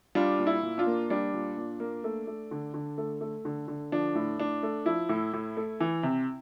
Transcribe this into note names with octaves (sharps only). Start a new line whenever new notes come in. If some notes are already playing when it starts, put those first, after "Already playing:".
G3 D4 F4
A#2
E4
A#2
D4 F4
A#3
G3 D4
A#2
A#2
A#3
A3
A3
D3
D3
A3
A3
D3
D3
F3 D4
A2
A2 D4
A3
F3 E4
A2
A2
A3
E3
C3